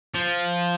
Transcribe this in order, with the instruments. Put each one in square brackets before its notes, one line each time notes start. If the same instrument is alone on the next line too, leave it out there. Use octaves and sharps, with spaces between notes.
[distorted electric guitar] F3